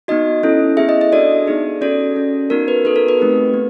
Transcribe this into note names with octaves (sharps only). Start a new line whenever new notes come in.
B3 D#4 F#4 D#5
C#4 E4 A4
B3 E4 G#4 E5
D#5
D#5
D4 F#4 A4 D5
B3 D#4 G#4
C#4 F#4 A4 D5
C#4 F#4 A4
B3 D#4 F#4 A#4
B4
B3 D#4 F#4 A4 B4
A#4
B4
A3 C4 D#4 G4
B3